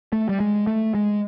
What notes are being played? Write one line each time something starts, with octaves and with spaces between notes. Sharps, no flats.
A3
G3
G#3
A3
G#3